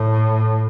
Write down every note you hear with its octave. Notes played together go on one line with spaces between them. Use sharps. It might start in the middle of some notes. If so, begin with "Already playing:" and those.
Already playing: A2